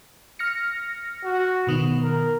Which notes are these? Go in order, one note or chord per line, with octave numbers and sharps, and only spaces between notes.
F6 A#6 C#7
F#4
B2 D#3 B3
A#4